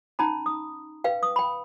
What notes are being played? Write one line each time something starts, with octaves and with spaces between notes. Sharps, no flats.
C#4 D#4 A#5 B5
D#6
B4 F5 G5
D#6
G5 B5